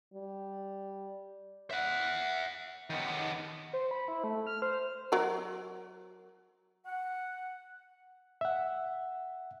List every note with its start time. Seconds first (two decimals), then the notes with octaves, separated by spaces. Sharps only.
0.14 G3
1.71 E5 F#5
2.90 D#3 B3
3.73 C5
3.91 B5
4.08 E4
4.24 A3
4.47 F6
4.62 C5
5.12 F#3 A#4
6.86 F#5
8.41 E5 F#5